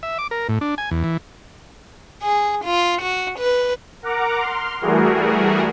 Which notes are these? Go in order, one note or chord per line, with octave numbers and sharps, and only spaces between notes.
E5
D6
A#4
A2
D4
G#5
E2
E3
G#4
F4
F#4
B4
A#4 F#5 A#5 D6
C6 F6
E3 G3 A3 F#4 G#4 A#4